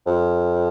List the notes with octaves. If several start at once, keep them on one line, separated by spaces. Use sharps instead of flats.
F2